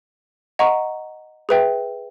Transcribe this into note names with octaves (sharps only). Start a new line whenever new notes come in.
D#5 F#5 A#5 C#6
G#4 B4 E5 G5